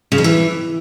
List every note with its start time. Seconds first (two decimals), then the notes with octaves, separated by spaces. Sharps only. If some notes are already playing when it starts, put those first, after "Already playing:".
0.12 C#3
0.18 F2
0.24 E3